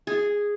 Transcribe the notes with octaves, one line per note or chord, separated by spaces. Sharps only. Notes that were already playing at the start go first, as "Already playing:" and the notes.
G#4